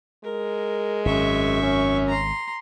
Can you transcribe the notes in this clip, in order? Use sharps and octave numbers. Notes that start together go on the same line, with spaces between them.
G#3 A#4
G#1 F#2 E5 C#6
C#4
A#5 C6